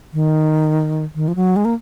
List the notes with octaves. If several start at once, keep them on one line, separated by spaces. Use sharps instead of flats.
D#3
D#3
F3
F#3
G#3
A#3